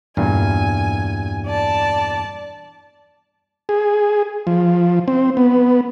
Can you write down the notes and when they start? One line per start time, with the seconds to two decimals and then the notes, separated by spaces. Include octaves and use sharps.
0.17 E2 G2 A#2 G#5
1.47 D5 A5
3.69 G#4
4.47 F3
5.08 C4
5.37 B3